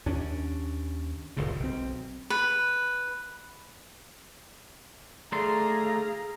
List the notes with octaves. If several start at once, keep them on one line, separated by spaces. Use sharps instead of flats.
D#2 C#4 D4
D#1 C#2 G2 C#3
B1 C4
B4
A3 G#4 D5 F5 A#5 C6